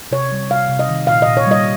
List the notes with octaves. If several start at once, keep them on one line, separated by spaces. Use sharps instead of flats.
C3 C#5
G3
C3 F5
C3
D#5
D#3
A#2 F5
A#2 D#5
C#5
G3 D#5